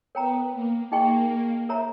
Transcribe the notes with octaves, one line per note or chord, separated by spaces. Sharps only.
B3 A#4 C#5 G5 A#5
A#3
A#3 D#4 G#4 D#5 G5 C#6
A#4 C#5 E5 A#5